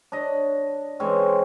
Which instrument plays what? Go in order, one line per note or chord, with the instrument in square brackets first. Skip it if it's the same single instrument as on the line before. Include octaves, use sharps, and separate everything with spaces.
[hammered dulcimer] D4 C#5 D#5
E3 G#3 C4 C#4